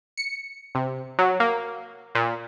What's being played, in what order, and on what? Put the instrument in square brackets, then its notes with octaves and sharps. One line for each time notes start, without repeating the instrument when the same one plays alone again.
[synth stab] C#7
C3
F#3
A#3
A#2